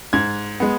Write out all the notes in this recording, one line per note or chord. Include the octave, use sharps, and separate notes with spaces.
G#2 G#6
G#3 B3